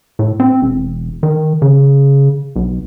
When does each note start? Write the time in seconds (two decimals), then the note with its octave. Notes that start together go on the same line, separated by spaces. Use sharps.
0.19 A2
0.40 C4
0.62 E1
1.23 D#3
1.62 C#3
2.56 B1